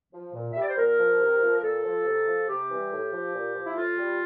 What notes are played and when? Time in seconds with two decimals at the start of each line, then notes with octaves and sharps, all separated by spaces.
0.13 F3
0.34 A#2
0.53 G3 E5
0.61 D5
0.69 C5
0.77 A#2 A#4
0.98 F3
1.20 C3
1.41 F3
1.57 A#4
1.62 A#2 A4
1.83 F3
2.05 C3
2.26 F3
2.48 C3 G4
2.69 E3 G3
2.91 A2
3.11 F3
3.33 A#2
3.55 F3
3.66 E4
3.76 A2 F4
3.97 G3